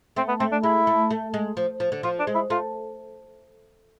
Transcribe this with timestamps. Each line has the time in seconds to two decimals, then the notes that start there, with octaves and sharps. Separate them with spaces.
0.16 A3 C4
0.28 B3
0.40 A3 C4
0.52 D4
0.63 G#3 E4
0.87 A3
1.11 A3
1.34 G#3
1.57 F3
1.80 F3
1.92 D3
2.03 F3 F4
2.19 D4
2.27 G#3
2.35 E4
2.50 A3 F4